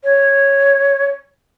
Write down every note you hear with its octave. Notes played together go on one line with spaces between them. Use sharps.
C#5